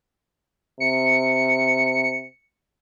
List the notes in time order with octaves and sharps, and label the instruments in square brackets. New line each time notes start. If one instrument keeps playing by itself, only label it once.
[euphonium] C3 [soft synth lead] C#7